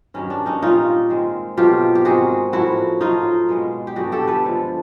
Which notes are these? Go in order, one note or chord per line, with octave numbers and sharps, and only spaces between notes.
G2 D#3 F#3 A#3 C#4
D4
C#4 D#4
A#2 G3 A#3 C#4 D#4 F4
D#3 G#3 C4
B2 F#3 A3 C4 F4 G4
G4
G#2 D#3 G#3 C4 F#4 G#4
A2 F3 A#3 E4 F#4
A2 F#3 A3 D#4 F4
B2 G#3 B3
G4
G2 D3 G3 F#4 G#4
G4 A4
A4 B4
D3 F3 G#3